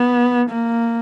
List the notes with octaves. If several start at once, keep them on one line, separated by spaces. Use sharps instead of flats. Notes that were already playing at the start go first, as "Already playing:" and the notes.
Already playing: B3
A#3